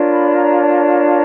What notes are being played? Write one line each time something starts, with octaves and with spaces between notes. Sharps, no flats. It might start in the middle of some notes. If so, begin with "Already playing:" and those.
Already playing: D4 F4 A#4 C#5
B5
A#5
A5